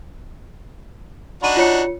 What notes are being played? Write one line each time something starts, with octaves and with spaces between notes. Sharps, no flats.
D4 D#4 F#4 B5 D#7
F4 C#5 C#7